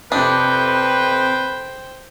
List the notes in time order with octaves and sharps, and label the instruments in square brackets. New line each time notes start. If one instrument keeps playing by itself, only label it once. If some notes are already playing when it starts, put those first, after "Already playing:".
[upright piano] F2 C3 [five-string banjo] D4 [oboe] B4 [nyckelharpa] C5 G5